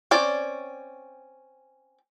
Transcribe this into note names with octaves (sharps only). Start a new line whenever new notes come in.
C4 C#4 D5